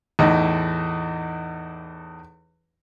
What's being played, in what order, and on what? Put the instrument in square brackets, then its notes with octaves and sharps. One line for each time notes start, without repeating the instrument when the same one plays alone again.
[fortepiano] E2 A2 D#4